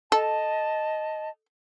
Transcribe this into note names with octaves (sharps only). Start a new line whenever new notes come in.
A4 D#5 A5